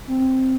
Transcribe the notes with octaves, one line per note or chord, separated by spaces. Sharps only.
C4